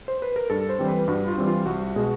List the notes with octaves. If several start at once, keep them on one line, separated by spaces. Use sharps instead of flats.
C5
B4
A#4
G2 A4
C5
E3 G3 C4
B4
G2 F#4
F4
E3 G3 C4
F4
C2 F#4
B2 G#3